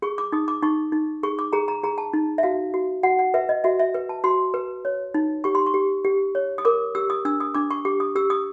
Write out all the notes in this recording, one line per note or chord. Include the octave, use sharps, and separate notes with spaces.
G#4 C#6
D6
D#4 D#6
D6
D#4 C#6
D#4
G#4 C#6
D6
G#4 A#5
A#5
G#4 A#5
A5
D#4
E5
F#4 F5
F#4
F#4 F#5
F#5
B4 E5
D#5
F#4 E5
E5
B4
A5
F#4 C6
B4
C#5
D#4
G4 C#6
C6
C#6
G4
G4
C#5
D#6
A#4 D6
G4 E6
D#6
D4 E6
D#6
D4 D6
C#6
G4 D6
D#6
G4 E6
D#6